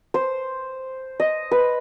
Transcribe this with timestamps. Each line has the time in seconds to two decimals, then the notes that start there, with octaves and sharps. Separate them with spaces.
0.14 C5
1.20 D#5
1.51 B4